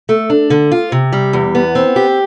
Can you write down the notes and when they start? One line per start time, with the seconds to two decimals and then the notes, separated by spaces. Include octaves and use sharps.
0.09 A3
0.30 D4
0.50 D3
0.71 F4
0.92 C3
1.13 G3
1.33 E2
1.55 B3
1.75 C4
1.96 G4